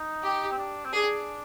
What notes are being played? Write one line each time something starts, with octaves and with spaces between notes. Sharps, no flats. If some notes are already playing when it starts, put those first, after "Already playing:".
Already playing: D#4
G4
C4
D4
C4
D4 G#4